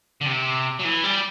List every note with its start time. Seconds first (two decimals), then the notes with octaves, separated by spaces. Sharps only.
0.21 D3
0.26 C3
0.79 F#3
0.84 E3
1.04 G3